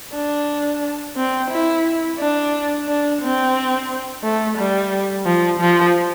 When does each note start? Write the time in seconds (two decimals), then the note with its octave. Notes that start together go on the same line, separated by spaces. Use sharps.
0.14 D4
1.17 C4
1.51 E4
2.19 D4
2.88 D4
3.22 C4
4.23 A3
4.58 G3
5.26 F3
5.60 F3